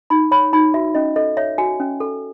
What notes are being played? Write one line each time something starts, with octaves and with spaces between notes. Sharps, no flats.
D#4 B5
C#5 B5
D#4 B5
F#4 E5
C#4 D#5
A4 D#5
C#5 E5
F#4 G#5
C#4
A4